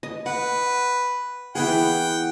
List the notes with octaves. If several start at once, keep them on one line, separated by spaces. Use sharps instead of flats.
D#5
B4 F#5
E3 B3 G#4 F#5 G5